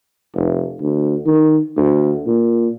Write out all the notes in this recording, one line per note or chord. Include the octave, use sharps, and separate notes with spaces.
F1
D2
D#3
D2
A#2